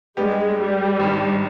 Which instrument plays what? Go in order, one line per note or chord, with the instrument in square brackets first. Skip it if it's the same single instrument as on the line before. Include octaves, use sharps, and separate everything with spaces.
[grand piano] G2 G3 B3 G4 [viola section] G#3
[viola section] G3
[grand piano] G#1 G2 D#3